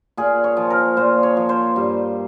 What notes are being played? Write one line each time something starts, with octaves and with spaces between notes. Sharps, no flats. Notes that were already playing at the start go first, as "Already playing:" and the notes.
A#2 G#4
C#5
F3
A#4
A#2 C5
C#5
F3
C5
G2